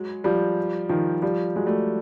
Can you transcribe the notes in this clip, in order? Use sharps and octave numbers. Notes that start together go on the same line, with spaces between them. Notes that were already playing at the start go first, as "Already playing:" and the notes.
Already playing: F#3 G#3
F3 G3
D#3 F3
F3 G3
F#3 G#3
G3 A3